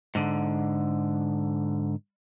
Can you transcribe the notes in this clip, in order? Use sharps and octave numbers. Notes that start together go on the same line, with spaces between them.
G#2 D3